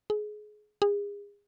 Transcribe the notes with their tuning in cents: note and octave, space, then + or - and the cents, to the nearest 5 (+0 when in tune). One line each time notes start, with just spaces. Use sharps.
G#4 +25
G#4 -35